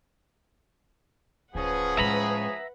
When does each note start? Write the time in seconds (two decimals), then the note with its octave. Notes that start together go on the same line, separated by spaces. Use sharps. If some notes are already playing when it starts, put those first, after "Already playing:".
1.55 D1 F3 C#4 G#4 B4 F#5
1.97 A2 G#3 E5 A#5 B5